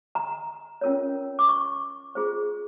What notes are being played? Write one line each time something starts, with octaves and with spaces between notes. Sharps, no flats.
A#5
C#4 F4 A#4 C#5
D6
C#6
F4 G#4 C5